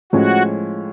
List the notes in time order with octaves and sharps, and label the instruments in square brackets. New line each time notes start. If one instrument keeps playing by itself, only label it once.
[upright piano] A2 F3 G#3 C#4 [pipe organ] F#4